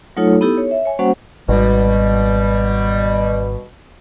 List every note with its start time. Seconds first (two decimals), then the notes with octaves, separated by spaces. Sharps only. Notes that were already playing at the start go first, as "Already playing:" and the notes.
0.17 F#3 A3 D#4 F4 A4 C#5
0.41 B3 D#4 E4 G4 A4
0.58 C#5
0.71 E5
0.85 C#5 G#5
0.99 G3 A#3 C#4 F#4 C5 F#5
1.49 G#1 B2 G3